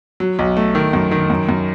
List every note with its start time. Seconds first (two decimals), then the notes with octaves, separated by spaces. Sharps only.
0.20 F#3
0.39 B1
0.57 A3
0.75 D#3
0.93 F#2
1.11 D#3
1.30 F#2
1.49 F#2